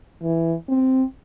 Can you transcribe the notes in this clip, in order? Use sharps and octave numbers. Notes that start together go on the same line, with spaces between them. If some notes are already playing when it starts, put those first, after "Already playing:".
E3
C4